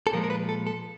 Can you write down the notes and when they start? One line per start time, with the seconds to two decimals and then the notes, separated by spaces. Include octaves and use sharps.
0.07 A4
0.13 A#2 F3 G#3 A#4
0.24 A#4
0.30 B4
0.49 A4
0.67 A4